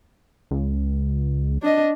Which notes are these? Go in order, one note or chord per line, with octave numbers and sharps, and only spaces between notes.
C#2
D4 D#5